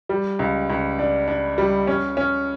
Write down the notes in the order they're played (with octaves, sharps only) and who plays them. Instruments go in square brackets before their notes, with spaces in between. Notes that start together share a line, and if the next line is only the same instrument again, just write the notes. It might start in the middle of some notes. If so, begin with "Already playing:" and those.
[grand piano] G3
C#2
C#2
D4
D4
G3
C#4
C#4